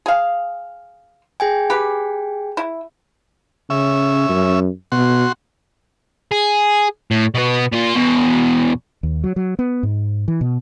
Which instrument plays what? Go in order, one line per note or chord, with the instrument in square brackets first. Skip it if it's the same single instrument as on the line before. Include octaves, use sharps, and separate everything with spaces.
[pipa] G#4 F5
[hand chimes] G#4 G5 G#5
[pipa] G4 B4
E4
[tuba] C#3 [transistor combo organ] C#4 E5
[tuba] F#2
[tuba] B2 [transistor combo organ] F#4 C6
[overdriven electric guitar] G#4
A2
B2 B3
A#2 F4
E2 B2
[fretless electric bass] D#2
F#3
F#3
B3
G#2
E3
B2